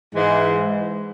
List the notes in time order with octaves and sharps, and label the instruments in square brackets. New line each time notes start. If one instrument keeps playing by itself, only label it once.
[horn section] G#2 E3 G#3